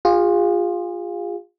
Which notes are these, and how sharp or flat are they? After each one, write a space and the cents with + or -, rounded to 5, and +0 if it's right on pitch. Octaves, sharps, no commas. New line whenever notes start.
F4 +10 G#4 -35